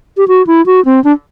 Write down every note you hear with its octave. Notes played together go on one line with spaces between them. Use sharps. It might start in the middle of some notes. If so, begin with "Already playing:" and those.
G4
F#4
E4
F#4
C4
D4